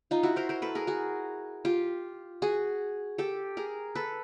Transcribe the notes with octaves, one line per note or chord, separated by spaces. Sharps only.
D#4 F4
E4 F#4
A#4 C5
A#4 C5
A4 B4
G#4 A#4
F#4 G#4
F4 G4
F#4 G#4
G4 A4
G#4 A#4
A4 B4